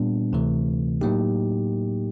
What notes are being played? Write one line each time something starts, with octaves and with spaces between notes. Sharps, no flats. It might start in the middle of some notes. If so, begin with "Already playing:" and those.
Already playing: A#2 G3 B3 D4
D2 C3 E3 A3
A2 F#3 A#3 D#4 G4